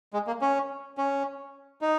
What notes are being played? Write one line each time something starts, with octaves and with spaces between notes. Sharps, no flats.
G#3
A#3
C#4
C#4
D#4